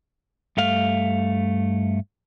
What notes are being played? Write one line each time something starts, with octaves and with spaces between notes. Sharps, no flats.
G2 A3 F5